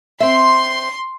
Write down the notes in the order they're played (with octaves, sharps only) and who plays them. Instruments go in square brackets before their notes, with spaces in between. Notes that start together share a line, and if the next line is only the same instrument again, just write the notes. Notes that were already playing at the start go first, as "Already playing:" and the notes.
[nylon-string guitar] C4 E5 [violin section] C6